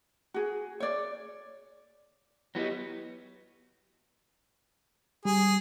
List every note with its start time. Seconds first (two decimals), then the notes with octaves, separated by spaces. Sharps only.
0.34 F#4 G#4
0.80 C#5 D5
2.55 F#3 B3 E4 G4 D#5
5.25 G3 G#4